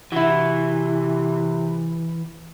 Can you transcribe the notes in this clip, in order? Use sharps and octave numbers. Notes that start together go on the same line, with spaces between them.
C3 E3 E4 F#4